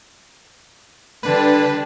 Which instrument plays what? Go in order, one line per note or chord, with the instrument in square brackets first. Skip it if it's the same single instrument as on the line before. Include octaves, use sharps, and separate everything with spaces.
[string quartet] D3 G3 D4 [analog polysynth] B4